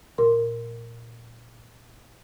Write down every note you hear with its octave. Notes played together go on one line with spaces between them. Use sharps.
A#2 A#4 C6